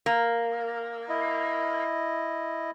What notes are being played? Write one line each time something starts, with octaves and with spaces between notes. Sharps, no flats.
A#3
E4 D#5